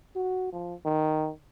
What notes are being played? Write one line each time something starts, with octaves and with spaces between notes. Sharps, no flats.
F#4
F3
D#3